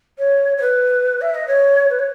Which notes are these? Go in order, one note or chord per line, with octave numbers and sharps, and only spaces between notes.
C#5
C#5
B4
E5
D#5
C#5
B4
C#5